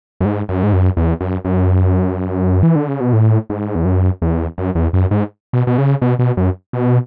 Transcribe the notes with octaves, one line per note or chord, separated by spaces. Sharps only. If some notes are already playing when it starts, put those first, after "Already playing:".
F#2
G#2
F#2
G#2
F#2
E2
F#2
F#2
E3
D3
C#3
B2
A2
G#2
E2
F#2
E2
F#2
E2
F#2
G#2
B2
B2
C#3
B2
B2
F#2
B2